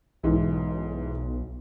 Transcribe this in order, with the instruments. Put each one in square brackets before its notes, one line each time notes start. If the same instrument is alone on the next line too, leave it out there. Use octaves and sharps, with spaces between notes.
[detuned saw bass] B1 [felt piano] G#2 E3